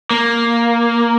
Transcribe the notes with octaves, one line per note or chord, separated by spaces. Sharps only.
A#3